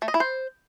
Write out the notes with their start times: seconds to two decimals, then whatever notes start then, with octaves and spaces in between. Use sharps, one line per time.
0.02 A3
0.08 D#5
0.14 E4
0.20 C5